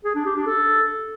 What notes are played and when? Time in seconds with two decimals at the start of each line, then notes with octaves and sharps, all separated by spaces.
0.05 G#4
0.15 D4
0.25 G4
0.36 D4
0.46 A4